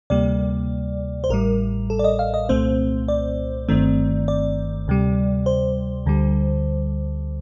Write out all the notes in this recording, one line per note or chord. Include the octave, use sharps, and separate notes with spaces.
D2 C3 G3 A#3 D5
C5
A1 A2 G3 A#4
A4
D5
D#5
F5
D#5
C2 A#2 A3 C4 C5
D5
G1 G2 D#3 A3 C4
D5
D2 C3 G3
C5
D2 D3 G3